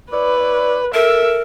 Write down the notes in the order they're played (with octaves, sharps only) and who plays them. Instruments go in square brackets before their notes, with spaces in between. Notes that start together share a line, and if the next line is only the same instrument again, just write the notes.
[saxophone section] E4 C#5 D5 [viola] B4
[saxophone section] A4 [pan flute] A#4 [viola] E5